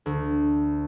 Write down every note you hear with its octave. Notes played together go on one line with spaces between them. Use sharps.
D2